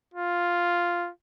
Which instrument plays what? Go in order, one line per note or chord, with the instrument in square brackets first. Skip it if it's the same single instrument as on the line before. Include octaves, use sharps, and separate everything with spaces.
[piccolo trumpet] F4